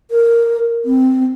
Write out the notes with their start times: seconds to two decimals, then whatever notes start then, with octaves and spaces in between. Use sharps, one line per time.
0.11 A#4
0.85 C4